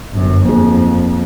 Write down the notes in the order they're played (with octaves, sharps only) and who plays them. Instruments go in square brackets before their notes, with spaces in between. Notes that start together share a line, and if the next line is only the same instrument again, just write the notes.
[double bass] G1 F#2
[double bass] F2 [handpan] A#3 G#4